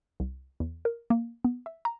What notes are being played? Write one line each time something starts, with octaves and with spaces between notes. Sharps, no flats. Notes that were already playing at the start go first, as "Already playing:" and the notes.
C2
E2
A#4
A#3
B3
E5
A#5